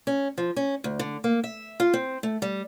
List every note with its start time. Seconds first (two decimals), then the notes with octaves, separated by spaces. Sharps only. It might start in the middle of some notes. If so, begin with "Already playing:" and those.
0.07 C#4
0.38 F3
0.56 C#4
0.84 D2
0.99 D3
1.24 A#3
1.44 E5
1.80 F4
1.94 C4
2.23 A3
2.42 G3